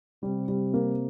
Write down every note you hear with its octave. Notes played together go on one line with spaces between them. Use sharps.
C3 G3
G3
A#3